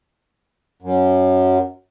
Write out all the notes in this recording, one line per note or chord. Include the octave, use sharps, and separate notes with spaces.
F#2